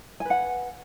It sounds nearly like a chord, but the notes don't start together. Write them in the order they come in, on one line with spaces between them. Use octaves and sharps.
G#5 B4 F#5